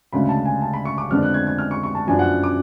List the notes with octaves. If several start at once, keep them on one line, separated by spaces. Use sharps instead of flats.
D2 C#3 G#3 D4 B5
A5
G#5
A5
B5
C#6
D6
F2 D3 G#3 B3 D4 F6
F#6
G#6
G#6
F6
C#6
C#6
A5
F#2 F3 B3 D4 G#5
F#5
D6